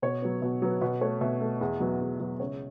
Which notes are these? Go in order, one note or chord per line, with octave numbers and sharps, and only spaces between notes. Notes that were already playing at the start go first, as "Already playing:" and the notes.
B2 C#5
F#3 B3
B2
F#3 B3
B2 B4
A3 C#5
B2 E5
A3
E2
B2 F#3 B3
E2
B2 F#3 B3
C#2 C#5